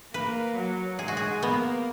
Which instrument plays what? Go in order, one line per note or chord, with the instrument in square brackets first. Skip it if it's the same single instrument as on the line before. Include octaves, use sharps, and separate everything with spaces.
[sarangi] A#3 [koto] B4
[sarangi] F#3
[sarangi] G#3 [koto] G#4
[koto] F#4
G#4
[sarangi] A#3 [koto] B3